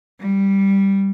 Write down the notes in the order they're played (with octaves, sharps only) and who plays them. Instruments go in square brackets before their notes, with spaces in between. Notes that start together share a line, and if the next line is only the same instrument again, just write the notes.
[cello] G3